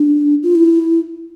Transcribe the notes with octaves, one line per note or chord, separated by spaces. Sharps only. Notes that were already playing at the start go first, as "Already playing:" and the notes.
Already playing: D4
F4
E4